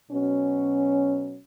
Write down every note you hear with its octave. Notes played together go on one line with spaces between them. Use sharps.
B2 F#3 C#4